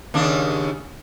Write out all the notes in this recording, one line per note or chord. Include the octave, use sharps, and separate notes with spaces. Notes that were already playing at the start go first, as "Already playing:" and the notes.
D#2 C#3 D4